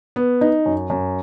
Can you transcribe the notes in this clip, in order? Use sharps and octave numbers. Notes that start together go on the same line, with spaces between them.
B3
D#4
F#2
F#2